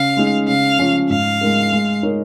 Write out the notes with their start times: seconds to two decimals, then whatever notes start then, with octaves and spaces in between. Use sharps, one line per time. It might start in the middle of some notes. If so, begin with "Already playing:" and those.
Already playing: C#3 F5
0.17 G#3 D#4 G#4
0.48 C#3 F5
0.79 F3 C#4 F4 C#5
1.10 G#2 F5
1.41 G#3 D#4 A#4
1.72 G#3
2.03 D#4 A#4 C#5